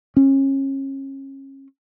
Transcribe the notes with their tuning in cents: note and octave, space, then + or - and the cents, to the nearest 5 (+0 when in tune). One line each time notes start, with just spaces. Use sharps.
C#4 -30